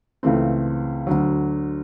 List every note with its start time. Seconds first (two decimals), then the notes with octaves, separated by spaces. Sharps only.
0.23 C#2 C#3 E3 A3 C4
1.07 D2 D3 F#3